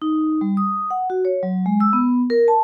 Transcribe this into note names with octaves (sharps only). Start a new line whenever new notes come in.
D#4
G3
D#6
F#5
F#4
C#5
F#3
G#3
E6
B3
A#4
A5